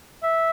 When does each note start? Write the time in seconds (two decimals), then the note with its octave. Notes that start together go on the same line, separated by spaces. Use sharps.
0.23 E5